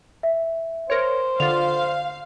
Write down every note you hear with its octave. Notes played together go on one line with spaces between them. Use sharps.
E5
A#4 C5 C#5
D3 F4 F5 F7